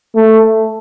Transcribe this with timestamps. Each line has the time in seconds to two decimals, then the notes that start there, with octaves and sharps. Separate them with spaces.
0.16 A3